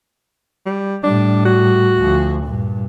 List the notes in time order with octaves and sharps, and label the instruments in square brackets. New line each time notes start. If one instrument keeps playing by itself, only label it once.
[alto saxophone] G3
[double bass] A2 G3 [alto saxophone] D4
[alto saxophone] F#4
[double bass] D2 F3
G2 A#2